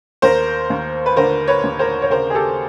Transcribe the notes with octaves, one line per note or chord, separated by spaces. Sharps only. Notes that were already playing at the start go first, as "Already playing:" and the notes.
D#2 A#4 C5
D#2
B4
D3 A#4 C5
B4 C#5
D#2
A#4 C5
C#5
C#3 A#4 C5
G#4
G4 A4